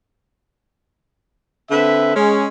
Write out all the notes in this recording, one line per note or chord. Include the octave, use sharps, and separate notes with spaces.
D3 C4 B4 E5
G#3 C#4